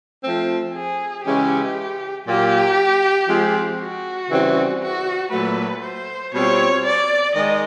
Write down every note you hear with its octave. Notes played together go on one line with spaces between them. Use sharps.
F3 A3 C4
G#4
C#3 E3 G#3 C#4 G4
A#2 F#3 A#3 G4
F3 G#3 C4 F4
F#4
C#3 E3 G3 C4
F#4
A#2 F#3 A3 B4
C5
B2 G3 C4 F4 C#5
D5
D#3 G#3 D#5